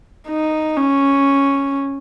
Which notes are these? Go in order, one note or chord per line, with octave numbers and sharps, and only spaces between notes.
D#4
C#4